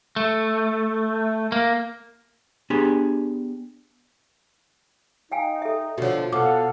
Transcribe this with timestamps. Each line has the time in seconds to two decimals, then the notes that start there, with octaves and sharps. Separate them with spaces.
0.16 A3
1.52 A#3
2.70 B3 D4 G4 G#4
5.32 D#4 F5 G5 G#5
5.62 A4 E5
5.98 B2 D3 F3 F#4 B4 C#5
6.32 B2 A4 F5 F#5 D6